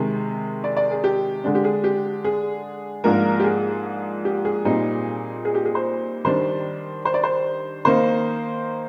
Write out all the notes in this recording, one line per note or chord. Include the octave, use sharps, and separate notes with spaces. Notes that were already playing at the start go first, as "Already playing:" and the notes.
Already playing: C3 D#3 G#3
D5
D5
G#4
G4
D3 G#3 D4
G4
G#4
G4
G#4
G#2 F3 A#3 D4 A#4
G4
G#4
G4
G#4
A#2 G3 C4 D#4
G#4
G4
G#4
C5
D#3 G3 D4 C5
C5
D5
C5
D#3 A#3 D#4 C5